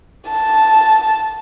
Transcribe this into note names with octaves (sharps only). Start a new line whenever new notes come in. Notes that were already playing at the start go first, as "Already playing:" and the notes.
A5